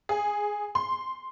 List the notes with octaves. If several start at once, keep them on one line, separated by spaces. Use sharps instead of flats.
G#4
C6